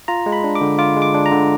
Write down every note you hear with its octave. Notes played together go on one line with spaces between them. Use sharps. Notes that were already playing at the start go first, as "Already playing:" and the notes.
F4 A#5
G#3
B5
D4
D6
D3
F4 D6
G#3
D6
D4
A#5
D3